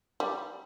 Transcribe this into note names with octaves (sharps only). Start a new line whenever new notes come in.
G3